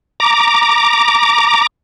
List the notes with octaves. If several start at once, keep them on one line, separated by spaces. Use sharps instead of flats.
A#5 D6